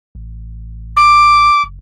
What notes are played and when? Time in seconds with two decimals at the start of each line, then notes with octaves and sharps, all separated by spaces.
0.15 A1
0.96 D6
1.63 F#1